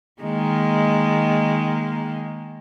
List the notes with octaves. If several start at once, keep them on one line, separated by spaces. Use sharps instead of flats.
D#3 G#3 A#3